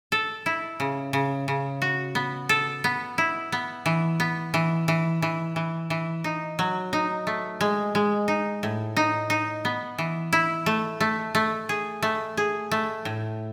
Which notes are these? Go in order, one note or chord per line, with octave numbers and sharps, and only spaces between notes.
A4
E4
C#3
C#3
C#3
F#4
B3
A4
B3
E4
B3
E3
B3
E3
E3
E3
E3
E3
D#4
F#3
D#4
A3
G#3
G#3
D#4
A2
D#4
D#4
B3
E3
E4
A3
A3
A3
G#4
A3
G#4
A3
A2